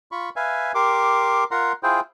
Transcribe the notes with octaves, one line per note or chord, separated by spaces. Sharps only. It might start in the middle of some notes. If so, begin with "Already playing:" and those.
F4 B5 C#6
B4 E5 F5 G#5
G4 A#4 C6 D6
F4 A#4 F#5 A#5 C6
E4 F4 G#4 C5 G5